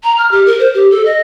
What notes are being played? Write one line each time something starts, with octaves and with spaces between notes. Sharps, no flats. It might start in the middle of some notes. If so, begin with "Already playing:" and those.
A#5
F6
G4
A#4
C5
G4
A4
D#5